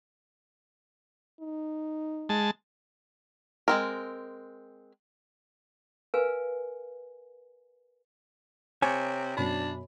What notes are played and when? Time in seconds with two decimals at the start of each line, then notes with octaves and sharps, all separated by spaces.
1.41 D#4
2.29 G#3 A5
3.68 G#3 C4 A#4
6.14 A#4 B4 F5 G#5
8.82 C3 C#5 G#5
9.37 F#2 B2 D4 B5